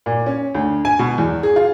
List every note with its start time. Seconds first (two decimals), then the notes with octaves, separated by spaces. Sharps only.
0.06 A#2
0.26 C#4
0.55 D2
0.85 G#5
0.99 B2
1.18 E2
1.43 G#4
1.56 F4